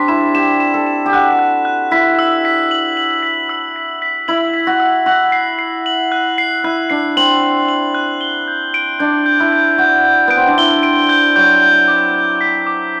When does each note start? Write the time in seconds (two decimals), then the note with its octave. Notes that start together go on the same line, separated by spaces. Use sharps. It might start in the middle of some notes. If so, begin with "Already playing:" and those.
Already playing: G3 C4 D4 B6
0.08 E4 E7
0.35 G4 E7
0.60 E7
0.74 A4
0.86 E7
1.06 G4
1.13 F#4 F#6
1.39 F#6
1.65 F#6
1.91 E4 B6
2.19 E6
2.45 B6
2.71 F#7
2.97 F#7
3.23 B6
3.49 E6
3.76 B6
4.02 B6
4.28 E4 F#7
4.54 B6
4.67 F#4
4.80 E6
5.06 F#4 F#7
5.32 C7
5.59 C7
5.86 F#7
6.12 F#6
6.38 C7
6.64 E4 F#6
6.90 D4 C7
7.17 C4 F#7
7.43 F#7
7.69 F#7
7.95 F#6
8.21 G7
8.48 G6
8.74 D7
8.99 D4 G6
9.26 G6
9.40 E4
9.52 G6
9.78 F#4 G6
10.05 G6
10.28 B3 D7
10.37 C4
10.47 D4
10.58 E4 G7
10.83 D7
11.09 G6
11.36 F#3 G6
11.63 G6
11.88 D6
12.14 G6
12.41 B6
12.67 D6